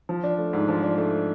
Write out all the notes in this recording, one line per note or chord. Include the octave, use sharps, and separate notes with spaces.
F3
D4
A3
G#2
F3
D4
A3